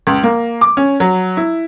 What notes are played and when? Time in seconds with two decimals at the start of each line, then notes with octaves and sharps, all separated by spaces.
0.07 C#2
0.23 A#3
0.61 D6
0.77 C#4
1.00 F#3
1.37 E4